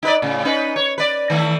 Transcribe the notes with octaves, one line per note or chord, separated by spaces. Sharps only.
D#4 B4 D5
A2 C#3
C#4 D#4 B4
C#5
B4 D5
D#3 E3 A3